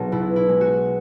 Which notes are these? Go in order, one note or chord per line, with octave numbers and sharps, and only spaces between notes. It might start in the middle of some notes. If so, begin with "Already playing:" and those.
Already playing: B1 F#4 G#4
B2 E4
E4
G#3
F#4